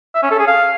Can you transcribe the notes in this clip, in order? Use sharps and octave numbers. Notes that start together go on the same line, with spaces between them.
E5
C#4
A4
G#4
F5